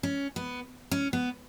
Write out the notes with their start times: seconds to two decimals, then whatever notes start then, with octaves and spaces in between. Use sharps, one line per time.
0.03 C#4
0.36 B3
0.91 C#4
1.13 B3